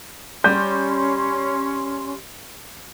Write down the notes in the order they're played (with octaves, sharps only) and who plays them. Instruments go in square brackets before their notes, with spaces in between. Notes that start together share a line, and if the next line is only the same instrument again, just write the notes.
[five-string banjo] G3 [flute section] C#4 C6 [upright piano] G6